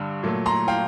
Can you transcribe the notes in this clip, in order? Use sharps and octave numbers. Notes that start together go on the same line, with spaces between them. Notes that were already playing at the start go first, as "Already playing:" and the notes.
Already playing: G2 D3
A#2 F#3 A3
A#5 C6
F5 G5